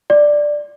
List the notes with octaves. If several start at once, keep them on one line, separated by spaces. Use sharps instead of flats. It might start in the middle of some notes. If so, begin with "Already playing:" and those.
D5